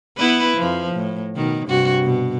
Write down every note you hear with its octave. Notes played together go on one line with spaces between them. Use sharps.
B3 E4 B4
F2 F3
A2
B2 D#3
G2 C3 F#4
B2